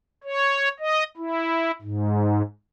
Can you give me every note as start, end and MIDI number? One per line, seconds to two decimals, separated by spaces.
0.24 0.69 73
0.80 1.04 75
1.17 1.71 64
1.82 2.42 44